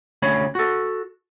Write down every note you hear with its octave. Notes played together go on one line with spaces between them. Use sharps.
D2 C#4 C#5 B5
F#4 A4